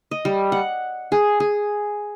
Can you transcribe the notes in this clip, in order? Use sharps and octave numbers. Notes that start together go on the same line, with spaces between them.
D#5
G3
F#5
G#4
G#4